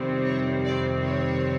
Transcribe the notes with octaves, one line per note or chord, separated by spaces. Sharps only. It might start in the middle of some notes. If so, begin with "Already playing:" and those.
Already playing: F2 C3 D#3 G3 C4
C#5
D5
C#5